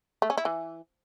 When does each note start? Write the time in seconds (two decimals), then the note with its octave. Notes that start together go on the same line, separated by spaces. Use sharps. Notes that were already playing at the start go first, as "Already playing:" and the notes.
0.22 A3
0.30 C#4
0.38 E4
0.45 E3